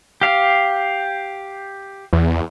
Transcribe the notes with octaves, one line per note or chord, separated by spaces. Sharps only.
G4 F5
E2